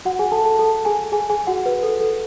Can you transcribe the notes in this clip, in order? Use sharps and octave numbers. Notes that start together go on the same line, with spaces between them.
F#4 F#5
G#4 G#5
A4 A5
A4 A5
A4 A5
G#4 G#5
G#4 G#5
G#4 G#5
F#4 F#5
B4
A4
A4